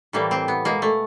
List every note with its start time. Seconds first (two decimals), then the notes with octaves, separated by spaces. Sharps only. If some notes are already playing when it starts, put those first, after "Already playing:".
0.13 A2 E3 G3 A#3
0.31 C4
0.48 B3
0.65 B2 G#3 A#3
0.82 A3